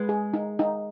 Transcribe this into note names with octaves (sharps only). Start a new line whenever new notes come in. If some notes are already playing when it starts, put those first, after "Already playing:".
Already playing: G#3 B4
G#4
D#4
D#4